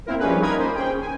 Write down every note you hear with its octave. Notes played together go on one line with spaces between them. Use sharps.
A#3 C4 E4 A#4
F3 G3 C#4 D#4 G#4 B4
A#3 D#4 A#4 B5 D#6 G#6
C5
C#4 G#4 G5
G#5